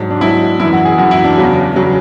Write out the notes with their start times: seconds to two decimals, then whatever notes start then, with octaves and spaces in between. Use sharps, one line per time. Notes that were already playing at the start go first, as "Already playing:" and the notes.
Already playing: G#2 F#3 D4
0.10 D4
0.21 G#2 F#3 E4
0.60 F#2 E3 E4
0.73 F#4
0.85 G#4
0.98 F#2 E3 F#4
1.11 E4
1.24 D4
1.38 E2 C#3 F#3
1.76 C#3 F#3